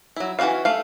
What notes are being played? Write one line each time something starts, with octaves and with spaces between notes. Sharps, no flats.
F#3 E4
E3 C#4 F#4 C#5 F5
A3 F5